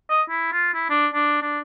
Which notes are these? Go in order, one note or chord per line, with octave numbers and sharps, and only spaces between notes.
D#5
E4
F4
E4
D4
D4
D4